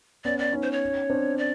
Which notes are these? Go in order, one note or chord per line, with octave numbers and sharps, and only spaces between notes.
B3 C#4 D5
D5
C#4 D#4
C5
C#5
C4 D4
D5